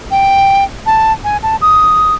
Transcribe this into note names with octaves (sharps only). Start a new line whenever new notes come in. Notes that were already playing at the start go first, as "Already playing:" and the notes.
G5
A5
G#5
A5
D#6